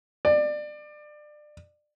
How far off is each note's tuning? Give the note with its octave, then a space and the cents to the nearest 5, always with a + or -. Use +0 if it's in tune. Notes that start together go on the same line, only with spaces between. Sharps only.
D5 +25